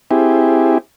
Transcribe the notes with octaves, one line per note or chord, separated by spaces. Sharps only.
C4 E4 G4 G#4